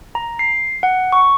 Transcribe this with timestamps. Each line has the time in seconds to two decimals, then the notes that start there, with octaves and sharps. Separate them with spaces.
0.15 A#5
0.39 C7
0.83 F#5
1.13 C#6